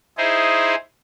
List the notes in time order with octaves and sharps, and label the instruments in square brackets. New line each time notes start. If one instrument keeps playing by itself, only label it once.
[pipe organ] D#4 E4 G#4 C5